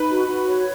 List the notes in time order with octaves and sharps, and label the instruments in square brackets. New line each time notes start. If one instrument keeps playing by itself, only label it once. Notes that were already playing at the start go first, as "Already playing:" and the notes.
Already playing: [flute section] D#4 [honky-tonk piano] B4
[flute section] F#4
F#4
C#5